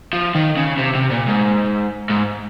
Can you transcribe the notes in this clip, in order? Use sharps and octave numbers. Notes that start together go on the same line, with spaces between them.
F3
D#3
C#3
C3
C3
A#2
G#2
G#2